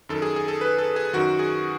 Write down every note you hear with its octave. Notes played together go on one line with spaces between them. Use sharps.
F#2 D#3 A4
G#4
G#4
A4
B4
A4
G#4
F#2 D#3 F#4
G#4